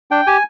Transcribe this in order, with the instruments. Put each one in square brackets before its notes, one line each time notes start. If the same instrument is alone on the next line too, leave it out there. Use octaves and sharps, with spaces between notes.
[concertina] D4 G5
G4 G#5